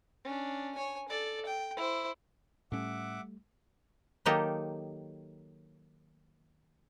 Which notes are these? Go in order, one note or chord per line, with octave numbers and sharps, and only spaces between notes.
C#4 D4
C#5 G#5
A4 D5
G5
E4 C5
A2 G3 A3 C#4 E5 F#5 D6
D#3 F#3 A#3 D#4 G4 A4